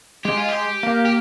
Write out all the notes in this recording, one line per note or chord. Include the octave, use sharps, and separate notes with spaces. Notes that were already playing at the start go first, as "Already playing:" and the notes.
G#3 G4
F4
G4
A#3
G4